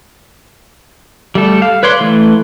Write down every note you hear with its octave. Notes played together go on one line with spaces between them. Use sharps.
G3 A3 A4
F5
B4 C#5 D5 C6
E3 A3